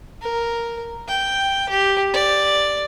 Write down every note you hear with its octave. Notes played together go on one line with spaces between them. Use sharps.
A#4
G5
G4
D5